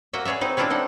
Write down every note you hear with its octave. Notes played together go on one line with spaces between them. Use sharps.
A#3 F#4 D#5 E5
G#4 B4 C#5 D5 E5
C4 D#4 B4
C4 D4 E4 F4 B4 C#5
D4 D#4 A4 F#5